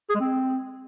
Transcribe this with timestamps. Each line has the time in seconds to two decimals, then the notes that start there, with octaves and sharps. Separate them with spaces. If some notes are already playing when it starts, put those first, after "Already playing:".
0.10 G#4
0.15 G#3
0.20 C4